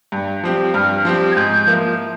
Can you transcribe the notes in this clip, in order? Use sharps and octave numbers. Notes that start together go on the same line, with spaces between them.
G2
F3 C4 G4
G2 F6
F3 C4 G4
G#6
G#2 G6
F3 A#3 E4